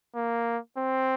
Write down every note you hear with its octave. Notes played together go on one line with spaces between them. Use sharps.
A#3
C4